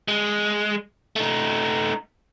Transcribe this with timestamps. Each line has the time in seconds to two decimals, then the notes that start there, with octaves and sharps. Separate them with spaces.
0.08 G#3
1.16 A3 D#4